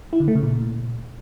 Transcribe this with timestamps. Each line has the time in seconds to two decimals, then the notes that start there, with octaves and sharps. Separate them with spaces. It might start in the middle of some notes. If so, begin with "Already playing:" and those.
0.13 E4
0.20 D3
0.28 A3
0.35 C#3
0.43 A#2